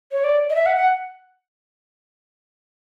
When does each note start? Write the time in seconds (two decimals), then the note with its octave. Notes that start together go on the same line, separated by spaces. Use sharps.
0.12 C#5
0.24 D5
0.50 D#5
0.55 E5
0.66 F#5
0.76 F#5